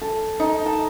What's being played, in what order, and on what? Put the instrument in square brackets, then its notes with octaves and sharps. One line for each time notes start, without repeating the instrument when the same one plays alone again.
[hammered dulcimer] A4
D#4
A5